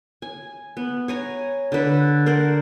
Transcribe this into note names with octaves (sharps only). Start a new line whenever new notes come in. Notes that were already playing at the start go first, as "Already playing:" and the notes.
G#5
B3
C#5 G#5 A#5
D3 B4
A#4 C5 D5 F#5